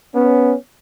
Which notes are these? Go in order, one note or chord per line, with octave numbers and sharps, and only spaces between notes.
B3 C#4